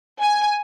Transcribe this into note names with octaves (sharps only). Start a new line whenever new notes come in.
G#5